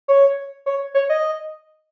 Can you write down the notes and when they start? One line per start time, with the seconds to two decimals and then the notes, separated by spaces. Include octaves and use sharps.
0.08 C#5
0.66 C#5
0.94 C#5
1.09 D#5